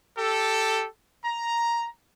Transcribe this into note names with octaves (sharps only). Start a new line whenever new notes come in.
G4 A4
A#5